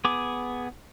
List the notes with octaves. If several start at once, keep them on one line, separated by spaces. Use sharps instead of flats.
B3 G#4 D6